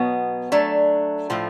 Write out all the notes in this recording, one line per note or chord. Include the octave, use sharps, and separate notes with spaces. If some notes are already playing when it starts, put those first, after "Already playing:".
Already playing: B2 F#3 B3
F#3 A3 D4
A2 F3 A3